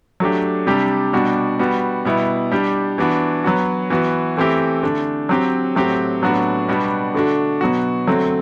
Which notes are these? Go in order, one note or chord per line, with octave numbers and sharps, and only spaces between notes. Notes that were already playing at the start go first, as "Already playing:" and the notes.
F#3 A3 D4 G4
C3 G3 D4 G4
B2 G3 D4 F#4
G3 B3 F#4
B2 G3 B3 E4
G3 D4 G4
E3 B3 D4 F#4
F#3 B3 F#4
E3 B3 F#4
E3 A3 C4 E4 G4
D3 A3 D4
F#3 C4 G4
A2 F#3 C4 G4
A2 F#3 B3 D4 F#4
B2 G3 B3 D4 F#4
D3 A3 D4 F#4
B2 F#3 B3 F#4
D3 F#3 A3 C4